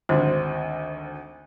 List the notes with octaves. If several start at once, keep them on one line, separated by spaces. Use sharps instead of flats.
G#1 D2 F#4 C5